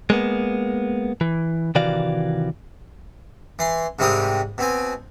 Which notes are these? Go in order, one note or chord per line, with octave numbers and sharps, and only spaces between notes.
G#3 A#3 B3
E3
C3 D#3 E3 F#4 D5 F5
E3 C6
G#2 C3 G3 C4 A#4 D#6
B2 C4 G#5